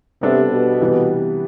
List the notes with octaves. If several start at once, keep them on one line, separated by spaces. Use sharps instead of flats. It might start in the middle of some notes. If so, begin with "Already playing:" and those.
C3 G3 B3 D4 A4
B2
C3 E3 G3 B3